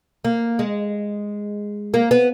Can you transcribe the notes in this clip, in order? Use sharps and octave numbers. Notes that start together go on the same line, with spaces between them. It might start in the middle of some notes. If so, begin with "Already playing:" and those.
A#3
G#3
A#3
B3